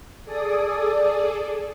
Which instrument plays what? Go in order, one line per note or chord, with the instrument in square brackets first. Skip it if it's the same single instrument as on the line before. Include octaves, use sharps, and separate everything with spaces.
[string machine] G#4 A4 D5 D#6